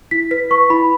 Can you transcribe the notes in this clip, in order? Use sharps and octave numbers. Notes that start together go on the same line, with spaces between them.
E4 B6
B4 B6
B4 C#6
E4 B5